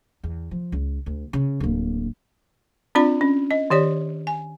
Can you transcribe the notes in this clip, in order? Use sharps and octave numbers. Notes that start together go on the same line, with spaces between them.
E2
F3
C#2
D2
C#3
D1 A#3
C4 D4 F4 D5 B5
C#4
D#5
D#3 G4 C#5 D5
G#5